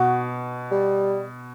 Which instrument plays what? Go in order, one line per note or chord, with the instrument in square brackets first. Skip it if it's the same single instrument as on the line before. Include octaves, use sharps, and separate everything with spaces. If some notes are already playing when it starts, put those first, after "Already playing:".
Already playing: [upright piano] B2 [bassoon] F#4
[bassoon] G3